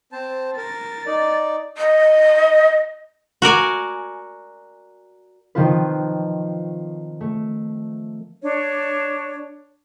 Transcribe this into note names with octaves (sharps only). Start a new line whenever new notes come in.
C4 C5 A5
A#4 A6
D#4 D5
D#5
F#4 A#4 D5 G#5
D#3 F3 C4 F4 B4
A3
D4 C#5